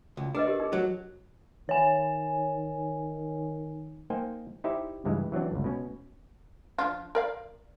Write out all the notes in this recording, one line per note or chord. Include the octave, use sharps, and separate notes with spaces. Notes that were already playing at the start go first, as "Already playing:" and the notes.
C#2
D4 G#4 B4 D#5
G4 A#4
D#4 G#4
F#3
D#3 C#5 G#5
A#3 D#4 C5 G5 G#5
D#4 E4 G4 C5 D5 E5
C#2 G2 E3 G#3
E3 F#3 C4 D4
G1 C#2
B2 C#4
F3 D4 F4
A#4 D5 F5